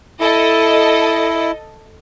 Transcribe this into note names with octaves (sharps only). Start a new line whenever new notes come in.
E4 A4 D#5